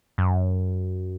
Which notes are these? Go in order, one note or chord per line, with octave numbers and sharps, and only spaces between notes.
F#2